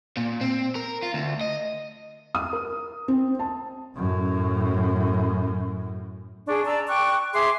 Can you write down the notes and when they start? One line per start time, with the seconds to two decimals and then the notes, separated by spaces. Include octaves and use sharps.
0.17 A#2
0.41 C4
0.75 A#4
1.03 F4
1.14 D2
1.41 D#5
2.35 D#6
2.53 A#4
3.08 C4
3.39 A5
3.96 F#2 A2
6.48 D4 G#4 C#6
6.65 D5 A5 A#5 E6
6.87 G5 C#6 D6 F#6
7.34 G#4 E5 C6 D6